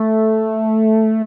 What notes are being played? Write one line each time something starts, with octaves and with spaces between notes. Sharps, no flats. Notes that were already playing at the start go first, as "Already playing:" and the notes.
Already playing: A3